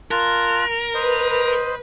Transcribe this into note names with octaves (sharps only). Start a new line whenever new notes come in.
F4 A#4 A5 F#6
B4 C5 D#5